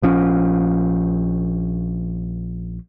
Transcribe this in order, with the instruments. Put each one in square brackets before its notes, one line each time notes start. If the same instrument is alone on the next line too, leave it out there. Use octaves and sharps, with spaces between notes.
[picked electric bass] A#1 F3 C#4